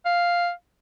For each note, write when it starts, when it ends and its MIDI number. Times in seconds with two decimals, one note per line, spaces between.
0.05 0.50 77